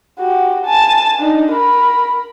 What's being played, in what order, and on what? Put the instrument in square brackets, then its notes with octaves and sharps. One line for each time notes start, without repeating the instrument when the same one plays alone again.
[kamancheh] F#4 G4
G#5 A5
D4 D#4
A#4 B5